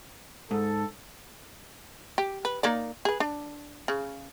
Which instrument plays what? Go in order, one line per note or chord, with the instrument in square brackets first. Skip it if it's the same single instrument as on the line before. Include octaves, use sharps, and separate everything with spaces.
[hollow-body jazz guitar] G#2 [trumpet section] A4
[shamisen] G4
B4
A#3 D#4 D5
G#4 B4
D4
C#3